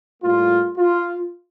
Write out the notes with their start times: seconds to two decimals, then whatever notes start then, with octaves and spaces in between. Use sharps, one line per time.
0.22 A2 G3 A#3 F4
0.77 F4